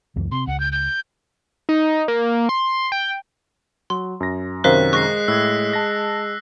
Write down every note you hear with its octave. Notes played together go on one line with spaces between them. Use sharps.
C#2 F#2 E3
C3 C6
C#2 F#5
G6
G6
D#4
A#3
C6
G5
F#3 C6
F#2 A#6
F#2 C3 D#3 A#4 C5 F5 F#6 B6
G#3 C#6 F#6 A#6 C7
A2 E6 G#6
A5 A#6